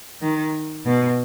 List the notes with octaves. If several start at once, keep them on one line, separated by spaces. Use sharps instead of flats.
D#3
B2